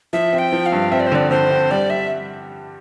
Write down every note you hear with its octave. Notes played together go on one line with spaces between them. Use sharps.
F3 E5
C4
G5
F3
F5
G2
C4 E5
D5
C5
D3 D5
D3 C5
C4
G3 D5
G3 E5